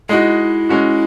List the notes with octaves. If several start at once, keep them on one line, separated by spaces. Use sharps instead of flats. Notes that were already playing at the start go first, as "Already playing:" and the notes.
G#3 D#4 E4 F#4
G#3 C#4 F#4